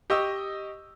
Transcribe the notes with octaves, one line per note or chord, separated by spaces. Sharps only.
G4 D#5 C#6 E6